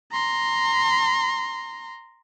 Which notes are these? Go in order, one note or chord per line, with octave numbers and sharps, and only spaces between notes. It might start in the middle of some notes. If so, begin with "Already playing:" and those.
A#5 C6